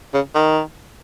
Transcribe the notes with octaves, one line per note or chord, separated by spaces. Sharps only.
C#3
D#3